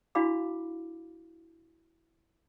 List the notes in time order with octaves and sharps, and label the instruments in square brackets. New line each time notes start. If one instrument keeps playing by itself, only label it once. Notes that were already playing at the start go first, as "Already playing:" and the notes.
[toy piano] D4 E4 F#4 F5 B5 D6